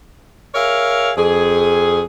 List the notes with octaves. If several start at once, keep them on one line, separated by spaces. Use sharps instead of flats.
G#4 A#4 C#5 E5 F5
F2 G#4